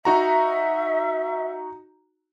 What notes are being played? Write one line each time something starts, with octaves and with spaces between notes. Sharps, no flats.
D#4 F#4 E5 A#5